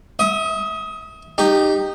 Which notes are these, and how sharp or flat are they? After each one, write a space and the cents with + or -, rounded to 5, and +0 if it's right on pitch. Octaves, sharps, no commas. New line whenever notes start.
E5 -25 D#6 +20
D#4 -15 G4 +0